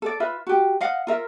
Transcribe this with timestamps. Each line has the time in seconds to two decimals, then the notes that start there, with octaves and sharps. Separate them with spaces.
0.02 A4 D5
0.20 F4 B4 E5
0.47 F#4 G4
0.81 D#5 F5 F#5
1.07 F4 A#4 E5